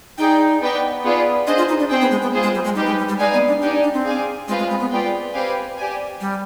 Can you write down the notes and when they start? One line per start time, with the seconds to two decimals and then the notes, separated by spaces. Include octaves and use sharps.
0.18 D#4 G#4 D5 G5
0.61 B3 D#4 B4 D5 G5
1.04 B3 F4 G#4 B4 D5
1.47 D4 G#4 C5 D#5
1.58 F4
1.68 D#4
1.79 D4
1.90 C4 G#4 C5 G5
2.01 B3
2.11 G#3
2.22 B3
2.33 F4 G#4 C5
2.43 G#3
2.54 G3
2.64 G#3
2.75 G3 D#4 G4 B4
2.86 G#3
2.98 G3
3.08 G3
3.19 G#3 D#4 B4 D5 F5 G#5
3.33 B3
3.47 D4
3.61 D4 D#4 G4 D5 G#5
3.83 D4
3.94 C4
4.05 G#4 D5 F5 G#5
4.48 G#3 C4 F4 B4 F5
4.58 G#3
4.70 G#3
4.80 B3
4.91 F4 G#4 B4 D5 G5
5.34 C4 G4 B4 F5 G#5
5.77 G4 D5 G#5
6.21 G3